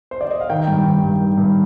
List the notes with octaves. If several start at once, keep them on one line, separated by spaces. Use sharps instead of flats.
C5
D5
D#5
F5
D#3 G5
G2
D#3
G2
D#3
G2